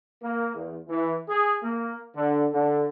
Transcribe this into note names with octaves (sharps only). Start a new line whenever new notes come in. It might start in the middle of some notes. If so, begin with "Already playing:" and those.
A#3
E2
E3
G#4
A#3
D3
D3